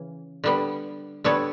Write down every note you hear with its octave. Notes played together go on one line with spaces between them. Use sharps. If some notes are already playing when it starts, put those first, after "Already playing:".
Already playing: C#3 E3
D3 G3 B3
D3 G3 B3 A4 C#5